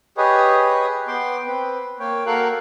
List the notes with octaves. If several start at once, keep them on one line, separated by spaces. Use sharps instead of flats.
G4 G#4 B4 C#5 D#5
B3 G5 C6 D6
C4 B4
A#3 C#5 G5
A#3 F#4 A4 A#4 F5 F#6